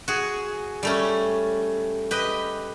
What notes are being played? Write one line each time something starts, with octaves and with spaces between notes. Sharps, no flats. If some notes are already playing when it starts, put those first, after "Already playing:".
F#4 G#4
G3 A3 C#4
G4 B4 D#5